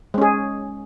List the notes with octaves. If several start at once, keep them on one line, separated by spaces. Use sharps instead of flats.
G#3 C#4 G#4